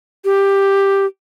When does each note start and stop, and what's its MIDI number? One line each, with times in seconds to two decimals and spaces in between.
0.25 1.06 67